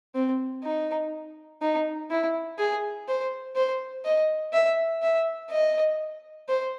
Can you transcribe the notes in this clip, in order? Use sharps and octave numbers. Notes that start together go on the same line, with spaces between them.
C4
D#4
D#4
E4
G#4
C5
C5
D#5
E5
E5
D#5
C5